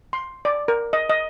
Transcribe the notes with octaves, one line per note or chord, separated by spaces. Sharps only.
C6
D5
A#4
D#5
D#5